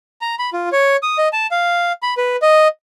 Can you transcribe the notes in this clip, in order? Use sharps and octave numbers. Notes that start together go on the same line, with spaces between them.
A#5
B5
F4
C#5
D#6
D#5
A5
F5
B5
B4
D#5